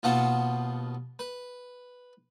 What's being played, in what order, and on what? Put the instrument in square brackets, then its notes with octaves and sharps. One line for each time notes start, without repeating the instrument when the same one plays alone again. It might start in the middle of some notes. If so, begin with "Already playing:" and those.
[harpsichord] D#2 B2 B3 F4 F#5 A5
B4